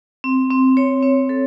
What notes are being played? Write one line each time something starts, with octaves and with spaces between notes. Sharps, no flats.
C4
C4
C#5
C4
A4